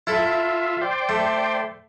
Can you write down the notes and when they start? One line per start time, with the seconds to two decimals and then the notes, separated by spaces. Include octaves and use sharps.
0.07 E4 F4 A4 E5
0.81 C5 D5 G5
1.09 A3